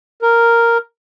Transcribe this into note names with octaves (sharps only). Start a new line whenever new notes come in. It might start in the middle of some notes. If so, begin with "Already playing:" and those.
A#4